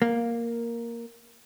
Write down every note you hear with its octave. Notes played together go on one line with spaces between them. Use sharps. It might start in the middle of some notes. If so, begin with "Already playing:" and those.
A#3